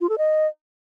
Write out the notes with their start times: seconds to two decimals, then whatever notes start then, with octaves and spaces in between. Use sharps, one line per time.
0.01 F4
0.09 A4
0.18 D#5